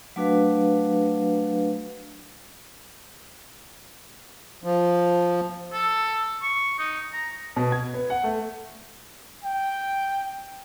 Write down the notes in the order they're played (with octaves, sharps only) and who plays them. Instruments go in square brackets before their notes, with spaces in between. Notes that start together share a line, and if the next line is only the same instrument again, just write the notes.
[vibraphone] F#3 A3 D4 F#4 B4 F5
[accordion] F3
[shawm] A4
C#6
D#4
A#5
[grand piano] B2
G#6
B3
F#5
A3
[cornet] G5